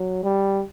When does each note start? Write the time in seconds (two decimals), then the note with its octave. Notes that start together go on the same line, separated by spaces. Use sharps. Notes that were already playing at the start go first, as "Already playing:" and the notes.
Already playing: F#3
0.24 G3